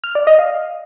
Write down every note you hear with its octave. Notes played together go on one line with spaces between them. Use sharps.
F6
D5
D#5
F5